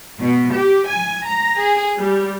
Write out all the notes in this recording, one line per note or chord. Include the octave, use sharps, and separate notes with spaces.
B2
G4
G#5
A#5
G#4
G3